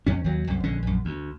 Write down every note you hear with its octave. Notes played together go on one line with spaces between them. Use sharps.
F2 C#4
D#2 F#3
C2 F#2
A#1 D3 G#3 C#4
A#1 F#2
D2